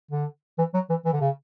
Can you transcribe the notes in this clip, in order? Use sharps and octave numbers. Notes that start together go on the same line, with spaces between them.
D3
E3
F#3
E3
E3
D3
C#3